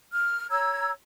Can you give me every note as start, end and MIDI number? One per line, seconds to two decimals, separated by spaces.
0.11 0.46 89
0.50 0.91 73
0.50 0.91 82
0.50 0.91 88
0.50 0.91 92